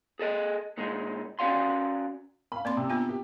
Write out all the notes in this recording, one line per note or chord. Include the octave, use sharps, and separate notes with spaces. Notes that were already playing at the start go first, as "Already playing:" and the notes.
G#4 A4 D#5
A#2 G#3 D#4
C#4 F#4 D5 F5 C6
F5 B5
A#3 C4 D5 C6
C3
B3 D4 F4
G4